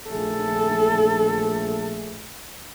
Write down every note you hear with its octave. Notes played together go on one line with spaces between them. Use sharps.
A#1 A3 G#4 A4